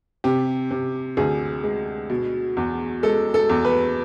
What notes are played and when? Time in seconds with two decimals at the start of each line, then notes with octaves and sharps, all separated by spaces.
0.24 C3 G4
0.71 C3
1.17 D2 G#4
1.64 G#3
2.10 B2
2.57 E2
3.03 G#3 A4
3.34 A4
3.50 E2
3.65 B4